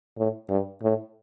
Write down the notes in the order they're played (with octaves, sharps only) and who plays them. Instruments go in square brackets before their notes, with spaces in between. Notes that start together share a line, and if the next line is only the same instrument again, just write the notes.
[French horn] A2
G2
A2